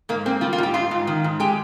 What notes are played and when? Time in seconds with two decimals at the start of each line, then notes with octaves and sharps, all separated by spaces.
0.09 G#2 A#3
0.26 A#3 C4
0.41 G3 F4
0.53 F4
0.58 G#2 G4
0.74 G#2 F4
0.91 G#2
1.07 D#3
1.24 G#2
1.40 G#3 G4